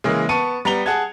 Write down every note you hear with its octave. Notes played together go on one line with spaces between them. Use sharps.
C#3 E3 G#3 A#3
B3 A5 C#6 C#7 D#7
G3 B3 A#5 F7 G7
G#4 F#5 A5 G#6